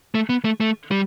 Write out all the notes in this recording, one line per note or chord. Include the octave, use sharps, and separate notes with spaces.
A3
B3
A3
A3
G3